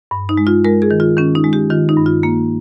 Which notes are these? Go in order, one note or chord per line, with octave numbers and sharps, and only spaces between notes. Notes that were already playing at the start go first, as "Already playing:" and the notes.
G2
D#4
G#3
F4
G#3 A#4
G#4
D#3
F4
D#3 C#4
D#4
G#3
G4
D#3 F4
D#4
G2
F4
A#3